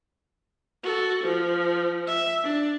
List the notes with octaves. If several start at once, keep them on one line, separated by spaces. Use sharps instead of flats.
F#4 A4
F3
E5
D4